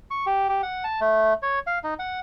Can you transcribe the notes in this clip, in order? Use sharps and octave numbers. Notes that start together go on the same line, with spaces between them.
C#6
G4
G4
F#5
A5
A3
C#5
F5
D#4
F#5